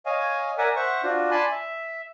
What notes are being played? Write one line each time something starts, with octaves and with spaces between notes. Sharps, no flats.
C#5 D#5 F5 G#5
A#4 D5 E5 F#5 G#5
C5 E5 F#5 C#6
D4 F4 F#4
D5 G#5 A5 B5 C6
E5